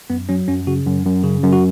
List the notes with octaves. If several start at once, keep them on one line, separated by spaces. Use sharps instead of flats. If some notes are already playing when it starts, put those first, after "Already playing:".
F#2 B3
F#3 C#4
F#2 C#4
C#3 F#4
F#2
F#2
C#3
F#2
F#4